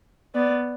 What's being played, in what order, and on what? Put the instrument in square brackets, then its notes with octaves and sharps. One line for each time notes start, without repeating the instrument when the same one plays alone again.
[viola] B3 [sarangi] D5